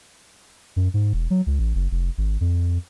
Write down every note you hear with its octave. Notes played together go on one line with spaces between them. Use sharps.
F#2
G#2
E1
F#3
C#2
A1
F#1
F1
G#1
F2